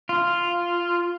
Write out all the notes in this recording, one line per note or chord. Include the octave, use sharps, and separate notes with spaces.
F4